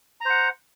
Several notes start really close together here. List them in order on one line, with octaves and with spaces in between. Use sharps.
A#5 C5 F#5